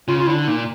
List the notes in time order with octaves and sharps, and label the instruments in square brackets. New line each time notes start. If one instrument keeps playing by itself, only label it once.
[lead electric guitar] C#3 [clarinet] F4
[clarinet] F4
[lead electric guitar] D3 [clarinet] E4
[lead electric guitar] A#2 [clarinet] D#4